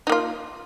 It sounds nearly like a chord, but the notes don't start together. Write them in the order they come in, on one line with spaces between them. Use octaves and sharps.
D#4 A#3 F4